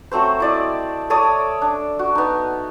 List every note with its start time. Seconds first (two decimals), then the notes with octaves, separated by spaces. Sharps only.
0.12 F#3 A3 C4 C5
0.40 E4 D5 D#5
1.10 A4 C#5 D5 D#6
1.61 D4
1.99 F#4
2.15 B3 D#4